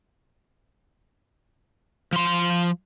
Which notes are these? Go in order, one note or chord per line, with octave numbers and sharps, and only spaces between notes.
F3 C6